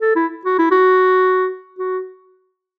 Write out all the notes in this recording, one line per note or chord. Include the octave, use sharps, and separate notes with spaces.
A4
E4
F#4
E4
F#4
F#4